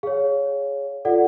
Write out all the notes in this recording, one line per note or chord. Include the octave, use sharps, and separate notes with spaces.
G#4 C#5 F5
F4 A4 D5 F#5